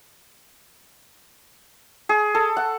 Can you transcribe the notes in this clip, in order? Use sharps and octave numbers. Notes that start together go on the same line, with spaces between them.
G#4
A4
F#5